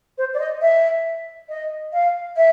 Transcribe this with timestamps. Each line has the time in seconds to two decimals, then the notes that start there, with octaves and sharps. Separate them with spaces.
0.18 C5
0.34 D5
0.40 D#5
0.61 E5
1.49 D#5
1.93 F5
2.37 E5